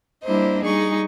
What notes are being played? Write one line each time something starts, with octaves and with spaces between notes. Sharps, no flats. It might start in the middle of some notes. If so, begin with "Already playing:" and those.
G3 A#3 D4 E4 C5 D#5
G3 D#4 G#4 C#6